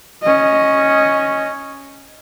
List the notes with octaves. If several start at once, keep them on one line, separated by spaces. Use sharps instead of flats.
C#4 D#5